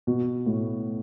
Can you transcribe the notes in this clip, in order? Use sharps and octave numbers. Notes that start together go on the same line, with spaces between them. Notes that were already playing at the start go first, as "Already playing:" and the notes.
B2
A2